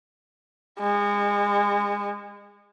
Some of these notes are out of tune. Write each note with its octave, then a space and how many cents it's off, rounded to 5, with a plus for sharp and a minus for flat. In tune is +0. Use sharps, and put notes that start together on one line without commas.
G#3 -30